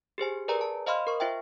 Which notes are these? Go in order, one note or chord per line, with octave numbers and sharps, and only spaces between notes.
G4 G#4 C5 G#5
G#4 A#4 B4 D5 G#5 A#5
A5
C5 D#5 F5 B5 C6 F6
A#4 C#6
F4 C5 E5 G5